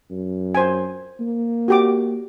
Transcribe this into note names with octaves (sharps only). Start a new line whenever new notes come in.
F#2
C5 G#5
A#3
F#4 G4 D6